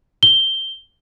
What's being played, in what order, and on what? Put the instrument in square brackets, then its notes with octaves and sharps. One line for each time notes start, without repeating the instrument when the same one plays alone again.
[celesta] G7